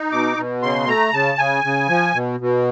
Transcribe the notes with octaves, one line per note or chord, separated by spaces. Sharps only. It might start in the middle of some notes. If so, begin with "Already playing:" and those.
Already playing: D#4
B2 D6
B2
C#3 C6
A3 A#5
C#3 A5
C#3 G#5
C#3
F3
B2
B2